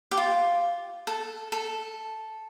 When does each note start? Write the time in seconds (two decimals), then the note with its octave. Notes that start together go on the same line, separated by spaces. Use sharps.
0.11 G4
0.17 F4
1.07 A4
1.52 A4